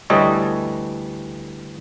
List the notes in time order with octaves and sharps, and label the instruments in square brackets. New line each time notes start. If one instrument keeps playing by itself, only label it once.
[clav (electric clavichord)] D2 E3 G3 A4 C#5 D#5